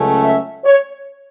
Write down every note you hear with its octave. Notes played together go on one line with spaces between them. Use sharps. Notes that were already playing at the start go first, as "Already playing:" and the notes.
Already playing: C#2 C#3 F#3 A3 C#4
E5
C#5